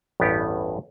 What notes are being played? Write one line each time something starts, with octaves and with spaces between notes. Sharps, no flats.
A1 E2 G2 B3 G4